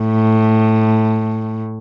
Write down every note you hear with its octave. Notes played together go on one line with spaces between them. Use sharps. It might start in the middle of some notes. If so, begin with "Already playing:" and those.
Already playing: A2